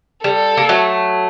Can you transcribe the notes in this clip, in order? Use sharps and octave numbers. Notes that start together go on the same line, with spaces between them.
G3 A4
A#3
F#3 A3